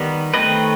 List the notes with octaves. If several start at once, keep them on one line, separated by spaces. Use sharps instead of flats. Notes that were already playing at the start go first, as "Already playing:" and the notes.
Already playing: D#3 G3 B3
D#3 A3 C4 B4 D#5